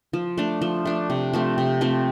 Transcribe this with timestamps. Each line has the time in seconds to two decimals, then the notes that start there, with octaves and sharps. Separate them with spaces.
0.13 F3
0.38 A3 D4
0.61 F3
0.85 A3 D4
1.10 C3
1.33 F3 A3 C4
1.58 C3
1.81 F3 A3 C4